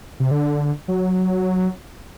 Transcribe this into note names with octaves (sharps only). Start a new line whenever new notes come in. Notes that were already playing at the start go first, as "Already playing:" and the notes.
C3
D3
F#3